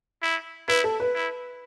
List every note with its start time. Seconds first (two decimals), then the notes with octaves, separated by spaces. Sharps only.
0.22 E4
0.68 E4 B4
0.84 A4
1.00 B4
1.14 E4